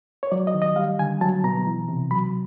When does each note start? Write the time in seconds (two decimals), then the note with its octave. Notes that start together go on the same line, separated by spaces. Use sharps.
0.23 C#5
0.32 F#3 D5
0.47 D#5
0.54 D#3
0.62 D#5
0.76 G3 F5
0.99 D3 G#5
1.21 F#3 A5
1.44 B2 A#5
1.67 E3
1.88 C3
2.11 F#3 B5